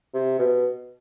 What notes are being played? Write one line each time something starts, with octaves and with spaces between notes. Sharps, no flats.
C3
B2